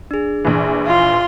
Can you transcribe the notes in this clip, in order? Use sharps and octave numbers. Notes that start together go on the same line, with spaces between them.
D4 G#4
A#1 E3
F4 C6